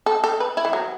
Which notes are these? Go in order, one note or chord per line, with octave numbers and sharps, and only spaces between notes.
A4
A4
B4
E4
E3
F#3